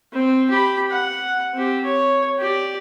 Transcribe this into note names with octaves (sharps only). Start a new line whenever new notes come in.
C4
G4 B5
F#5
C4 G4
C#5
G4 D5